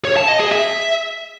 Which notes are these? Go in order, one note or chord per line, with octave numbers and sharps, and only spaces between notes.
C#5
A5
D#5
G#4
E5